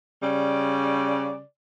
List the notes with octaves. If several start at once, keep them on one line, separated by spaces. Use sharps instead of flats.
C#3 G3 D5